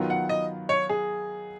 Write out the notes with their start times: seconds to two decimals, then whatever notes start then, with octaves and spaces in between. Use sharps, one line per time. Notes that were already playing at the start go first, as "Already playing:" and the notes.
Already playing: D#3 F#3 B3 F4
0.10 F#5
0.29 D#5
0.69 C#5
0.89 G#4